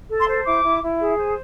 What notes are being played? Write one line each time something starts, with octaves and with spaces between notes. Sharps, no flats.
A4
C6
C5
E4 D6
E4
E4
G#4
C5